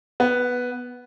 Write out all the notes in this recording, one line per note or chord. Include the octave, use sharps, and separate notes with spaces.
B3